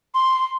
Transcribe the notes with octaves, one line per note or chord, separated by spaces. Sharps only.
C6